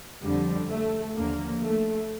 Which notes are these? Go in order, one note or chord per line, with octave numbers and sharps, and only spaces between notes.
F2 D3 F3 G3
A3
D#2 D3 F3 A#3
A3